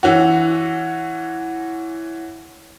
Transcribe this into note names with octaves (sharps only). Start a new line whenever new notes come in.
E3 C#4 F#4